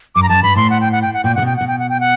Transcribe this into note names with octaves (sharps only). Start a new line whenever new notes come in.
F#2 D6
A#5
F#2 A5
G2 B5
A2 C6
F#5
G5
F#5
G5
F#5
A#2 G5
C3 F#5
B2 G5
B2 F#5
G5
F#5
G5
F#5